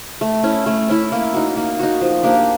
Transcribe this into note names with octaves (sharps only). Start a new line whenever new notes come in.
A3
C#4 E4
A3
C#4 E4
A#3
D#4 F#4
A#3
D#4 F#4
F3
A#3 D4 G4